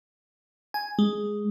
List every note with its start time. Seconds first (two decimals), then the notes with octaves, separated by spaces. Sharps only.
0.74 G#5
0.99 G#3